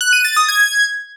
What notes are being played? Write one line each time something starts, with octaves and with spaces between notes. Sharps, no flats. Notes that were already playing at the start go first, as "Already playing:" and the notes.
F#6
D#7
A6
D#6
G#6